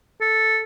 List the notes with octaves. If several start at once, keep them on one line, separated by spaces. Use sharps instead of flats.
A4